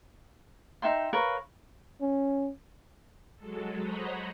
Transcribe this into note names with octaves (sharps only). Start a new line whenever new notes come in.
D#4 E5 G5 C6
A#4 B4 C#5 F5
C#4
F#3 G#3 A4
C5 C#5 D#5 F#5 A#5 B5